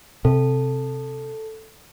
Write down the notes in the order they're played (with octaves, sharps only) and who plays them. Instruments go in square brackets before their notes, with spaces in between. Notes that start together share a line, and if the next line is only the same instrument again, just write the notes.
[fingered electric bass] C3 [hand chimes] A4